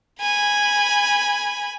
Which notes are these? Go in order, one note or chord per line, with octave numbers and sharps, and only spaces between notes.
G#5 B5